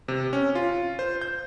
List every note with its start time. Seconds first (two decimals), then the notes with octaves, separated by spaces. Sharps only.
0.08 C3
0.33 C#4
0.55 F4
0.99 C5
1.22 G6